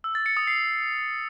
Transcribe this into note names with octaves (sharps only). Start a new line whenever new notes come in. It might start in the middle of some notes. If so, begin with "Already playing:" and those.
E6
A6
C#7
D#6
C7